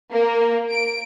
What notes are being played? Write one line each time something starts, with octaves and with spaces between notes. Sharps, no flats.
A#3
D7